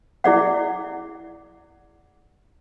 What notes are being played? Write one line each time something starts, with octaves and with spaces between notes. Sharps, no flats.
E4 G#4 D5 F#5